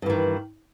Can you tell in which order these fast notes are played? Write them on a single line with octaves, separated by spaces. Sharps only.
G2 E3 D#3